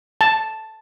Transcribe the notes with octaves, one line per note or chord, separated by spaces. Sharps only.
A5